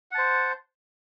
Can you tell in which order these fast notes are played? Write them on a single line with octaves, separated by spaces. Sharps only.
F#5 A5 C5